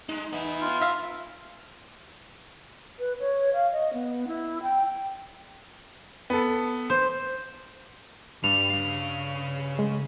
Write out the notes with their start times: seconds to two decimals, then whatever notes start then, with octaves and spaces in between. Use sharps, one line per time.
0.09 G#3 D#4
0.33 B3 E4
0.61 F4
0.82 E5 F5 A#5
2.99 B4
3.19 C#5
3.53 F5
3.72 D#5
3.93 B3
4.27 E4
4.63 G5
6.30 B3 A4
6.90 C5
8.44 G2 G3 F7
8.70 C#3 F5
9.79 G#3